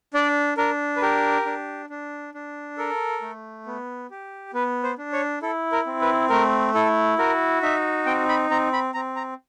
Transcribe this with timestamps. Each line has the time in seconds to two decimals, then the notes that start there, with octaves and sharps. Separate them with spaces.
0.14 D4 D5
0.57 D4 A#4
0.96 B4
1.02 G4 A#4
1.46 D4
1.90 D4
2.34 D4
2.77 A4 A#4
3.22 A3
3.66 B3
4.11 G4
4.54 B3 B4
4.83 C5
4.98 D4
5.13 C#5
5.42 E4 A4
5.72 A#4
5.86 C4
6.01 B4
6.30 A3 A#4
6.74 E4 A4
7.18 F#4 A#4
7.62 D#4 E5
8.06 C4 G5
8.29 B5
8.50 C4 A#5
8.73 B5
8.94 C4 A#5
9.16 A#5